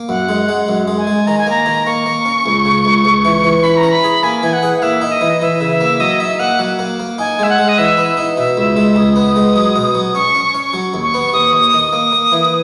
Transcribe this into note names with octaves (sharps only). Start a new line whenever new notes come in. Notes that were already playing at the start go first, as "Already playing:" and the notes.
Already playing: A#3
F#2 F#5
G#3
G#3
F#2
G#3
G#5
G#3
D#3 A#5
G#5
A#3 A#5
D#3
A#3 C#6
A#3
C#4
C#2
C#3
C#2
C#2
E3
E3
C#4 B5
A#5
C#4
B5
G#4
A#3 G#5
E3 G#5
F#5
G#4
F#5
A#3 E5
D#4
D#5
E3
E3 E5
C#3
E5
A#3
F#3 D#5
D#4 E5
A#3 F#5
F#3
A#3
A#3
D#4 G#5
G#3 E5
F#5
G#3
D#5
E3 E5
B3
D#4
B2 E5
C#2
G#3
C#2 D#6
B3
G#3
F#3
B2
F#3
D#6
C#4 C#6
C#4
C#6
C#4
F#3
D#2
C#6
B3
D#2 D#6
D#2
D#3
A#3 D#6
A#3
E3